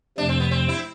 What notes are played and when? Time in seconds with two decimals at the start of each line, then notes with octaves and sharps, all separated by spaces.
0.17 F2 C3 F3 A3 D4
0.29 C4
0.40 B3
0.51 C4
0.69 E4